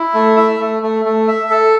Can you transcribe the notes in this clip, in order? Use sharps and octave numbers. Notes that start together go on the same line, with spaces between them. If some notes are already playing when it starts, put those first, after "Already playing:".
Already playing: E4
A3
E5
A3
A3
A3
E5
A4